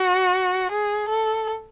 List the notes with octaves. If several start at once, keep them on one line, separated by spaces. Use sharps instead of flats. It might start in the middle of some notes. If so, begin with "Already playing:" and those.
Already playing: F#4
G#4
A4